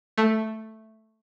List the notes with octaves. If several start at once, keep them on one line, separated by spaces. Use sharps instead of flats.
A3